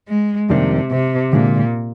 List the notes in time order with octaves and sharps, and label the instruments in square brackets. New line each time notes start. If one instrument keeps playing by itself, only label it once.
[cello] G#3
[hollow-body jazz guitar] F2 D#3 G3 A#3 D4 [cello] C3
[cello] C3
[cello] A#2 [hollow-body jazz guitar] D3 G#3 D4